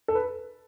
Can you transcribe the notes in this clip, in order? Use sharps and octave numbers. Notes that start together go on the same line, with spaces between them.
A4
B4